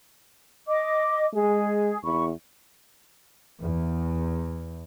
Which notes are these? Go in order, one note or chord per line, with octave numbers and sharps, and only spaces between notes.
D#5 D6
G#3 G#4
E2 B5 C#6
E2